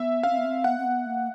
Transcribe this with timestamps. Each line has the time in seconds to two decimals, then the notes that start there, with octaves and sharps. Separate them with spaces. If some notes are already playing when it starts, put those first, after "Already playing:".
Already playing: B3 E5
0.23 C#4 F5
0.30 C4
0.38 B3
0.45 C4
0.64 B3 F#5
0.78 C4
0.85 B3
1.06 A#3